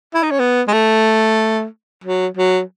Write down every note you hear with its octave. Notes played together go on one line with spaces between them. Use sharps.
E4
D#4
C#4
B3
G#3
A3
F#3
F#3